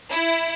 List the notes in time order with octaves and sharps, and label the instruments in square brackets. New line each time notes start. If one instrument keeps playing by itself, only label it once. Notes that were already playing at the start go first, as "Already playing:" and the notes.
[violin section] E4